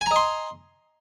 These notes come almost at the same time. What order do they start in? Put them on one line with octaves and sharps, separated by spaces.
G#5 A#5 D#5 C6